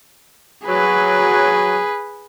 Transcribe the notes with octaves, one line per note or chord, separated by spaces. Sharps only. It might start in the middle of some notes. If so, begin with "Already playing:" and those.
F#3 G#4 B4